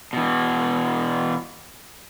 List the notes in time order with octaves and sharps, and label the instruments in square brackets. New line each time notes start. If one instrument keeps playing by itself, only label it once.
[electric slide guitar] B2 E3